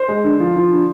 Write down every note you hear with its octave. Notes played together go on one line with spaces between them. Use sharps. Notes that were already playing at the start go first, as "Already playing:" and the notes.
Already playing: C5
G#3
D3
F3
F3
D3